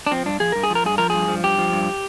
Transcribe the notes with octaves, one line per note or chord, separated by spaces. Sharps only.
D4
F3 C4
G2 D4
F3 G#4
G2 A#4
G#4
F3
A#4
G2 G#4
F3 A#4
G2 G#4
F3
G2 G4
F3
G2